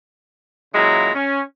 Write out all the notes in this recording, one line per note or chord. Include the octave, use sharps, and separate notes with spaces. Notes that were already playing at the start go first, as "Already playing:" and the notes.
A#2 C#3 F#3 G#3 E4 A#5
C#4